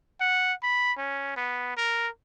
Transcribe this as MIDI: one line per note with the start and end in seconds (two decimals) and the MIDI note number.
0.20 0.53 78
0.63 0.92 83
0.97 1.33 61
1.36 1.76 59
1.77 2.08 70